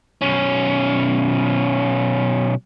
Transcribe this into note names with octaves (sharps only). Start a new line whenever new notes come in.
B1 C#4